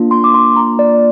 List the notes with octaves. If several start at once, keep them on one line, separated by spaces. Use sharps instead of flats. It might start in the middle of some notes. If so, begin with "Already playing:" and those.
Already playing: A#3 D4 F4
C6
D6
C6
A#5
D5